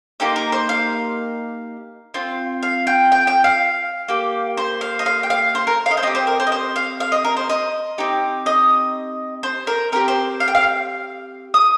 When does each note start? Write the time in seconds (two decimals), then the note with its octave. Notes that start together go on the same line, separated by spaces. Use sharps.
0.20 A#3 D#4 G4 C5
0.36 A#4
0.52 C5
0.69 F5
2.14 C4 F4
2.63 F5
2.87 G5
3.12 G5
3.27 G5
3.44 F5
4.08 A#3 G4
4.57 C5
4.81 F5
4.99 D#5
5.06 F5
5.23 G5
5.30 F5
5.55 C5
5.67 A#4
5.86 F5
5.91 D#5
5.97 C5
6.03 C4 G4 D#5
6.15 C5
6.27 A#4
6.40 C5
6.47 D#5
6.52 C5
6.76 F5
7.00 F5
7.12 D#5
7.25 A#4
7.37 C5
7.49 D#5
7.98 C4 D#4 G4
8.46 D#5
9.43 C5
9.67 A#4
9.92 C4 D#4 G4 A#4
10.08 C5
10.40 F5
10.48 G5
10.55 F5
11.54 D#6